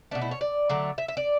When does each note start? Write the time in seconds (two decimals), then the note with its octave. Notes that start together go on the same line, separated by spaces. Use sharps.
0.11 B2 A3 D4
0.22 E4
0.31 C#5
0.41 D5
0.70 D3 F#3 A3
0.98 E5
1.08 E5
1.17 D5